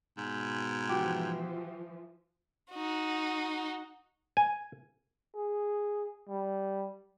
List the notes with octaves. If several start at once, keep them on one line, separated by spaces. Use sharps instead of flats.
G#2 B2
E3 F3 F#4 G4
D#4 F#4
G#5
G#4
G3